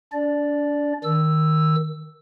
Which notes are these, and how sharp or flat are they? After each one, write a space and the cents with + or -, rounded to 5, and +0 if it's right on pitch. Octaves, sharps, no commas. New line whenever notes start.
D4 -30 D5 +0
D#3 +0 E6 +0